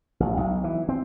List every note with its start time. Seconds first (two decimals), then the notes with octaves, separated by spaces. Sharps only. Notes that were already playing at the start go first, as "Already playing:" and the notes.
0.20 A1
0.37 B1
0.64 E3
0.89 C4